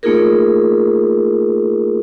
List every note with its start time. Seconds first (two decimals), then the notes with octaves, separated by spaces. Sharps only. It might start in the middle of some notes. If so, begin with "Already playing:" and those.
0.03 A3 A#3 D#4 F4 G#4 A#4